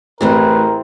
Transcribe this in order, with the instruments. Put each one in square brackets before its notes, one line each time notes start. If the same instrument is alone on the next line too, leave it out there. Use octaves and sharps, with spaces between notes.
[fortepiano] A1 A2 [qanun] E3 C4 G#4 [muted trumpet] A#4 [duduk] B4